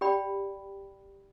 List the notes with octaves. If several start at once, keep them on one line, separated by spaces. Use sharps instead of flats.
G4 D5 G5 B5